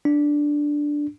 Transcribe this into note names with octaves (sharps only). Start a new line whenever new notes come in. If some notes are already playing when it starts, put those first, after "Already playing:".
D4